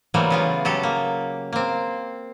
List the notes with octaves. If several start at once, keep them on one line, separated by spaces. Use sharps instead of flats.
E3 F#3 G3 A3 A#3 C4
C#3 B3 F4
F#3 G4 A4
A#3
A#3 C4